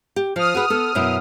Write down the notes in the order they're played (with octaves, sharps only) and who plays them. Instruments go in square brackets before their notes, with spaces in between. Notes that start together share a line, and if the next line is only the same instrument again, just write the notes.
[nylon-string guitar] G4
[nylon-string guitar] F3 [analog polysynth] D#6 F6
[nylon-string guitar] F#4 G#4 B4
B3 A4
F#2 B2 E4